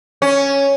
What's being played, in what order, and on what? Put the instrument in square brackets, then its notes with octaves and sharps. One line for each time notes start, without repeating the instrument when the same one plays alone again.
[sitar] C#4